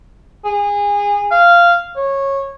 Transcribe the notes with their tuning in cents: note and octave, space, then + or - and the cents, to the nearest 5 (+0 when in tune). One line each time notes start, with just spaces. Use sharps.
G#4 -25
F5 -10
C#5 -15